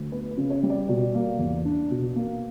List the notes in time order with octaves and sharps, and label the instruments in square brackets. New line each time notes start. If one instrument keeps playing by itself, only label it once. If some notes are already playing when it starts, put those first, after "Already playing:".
Already playing: [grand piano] D2
B3 B4
B4
C#3
C#5
G3
D5
B2 D5
A#3
E2
D4
B2
A#3